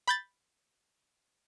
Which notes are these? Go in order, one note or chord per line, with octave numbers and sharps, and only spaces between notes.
B5 G6 A6